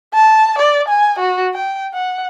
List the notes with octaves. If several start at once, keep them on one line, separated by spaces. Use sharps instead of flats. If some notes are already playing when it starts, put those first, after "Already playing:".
A5
D5
G#5
F#4
G5
F#5